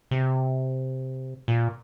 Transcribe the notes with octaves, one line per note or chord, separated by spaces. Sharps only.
C3
A#2